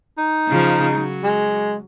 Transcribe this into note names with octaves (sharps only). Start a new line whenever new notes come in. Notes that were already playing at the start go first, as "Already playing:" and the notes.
D#4
C#3 F3
F#3
G#3